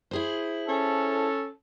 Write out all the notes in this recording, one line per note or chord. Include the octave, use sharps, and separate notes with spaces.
E4 G#4 C5
C#4 A4